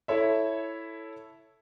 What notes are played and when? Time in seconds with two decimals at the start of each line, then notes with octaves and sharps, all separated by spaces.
0.08 E4 A4 C#5 E5